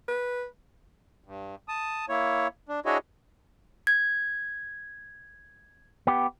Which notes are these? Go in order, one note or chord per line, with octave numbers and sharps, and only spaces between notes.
B4
G2
A5 D#6
A#3 E4 C#5
D4
D4 E4 F#4 G#4 C#5 D#5
G#6
B3 G4